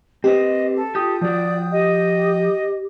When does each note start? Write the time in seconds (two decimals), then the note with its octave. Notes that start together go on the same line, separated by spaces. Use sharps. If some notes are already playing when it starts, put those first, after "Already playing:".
0.24 C4 G4 B4 C5 D#5
0.76 A4
0.95 F4 G4 G5 D#6 G6
1.21 F3 F#4 D5
1.72 G4 D#5